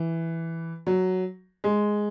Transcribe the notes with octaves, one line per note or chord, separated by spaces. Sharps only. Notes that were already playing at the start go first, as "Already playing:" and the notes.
Already playing: E3
F#3
G#3